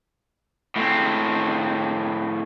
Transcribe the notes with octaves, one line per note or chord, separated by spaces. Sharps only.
A2 C4